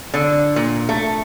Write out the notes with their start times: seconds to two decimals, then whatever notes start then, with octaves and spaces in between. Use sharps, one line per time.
0.14 D3
0.56 A#2
0.89 A3